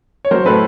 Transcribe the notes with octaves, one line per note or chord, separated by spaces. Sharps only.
C#5
F#3 A#4 C5
A2 A4 B4